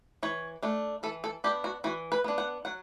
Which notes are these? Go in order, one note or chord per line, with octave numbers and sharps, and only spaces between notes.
E3 C#5
A3 D4
E3 A4
A4
B3 D4 G4
F#4
E3 F#4
B4
B3 D4
F#5
F#3 F#5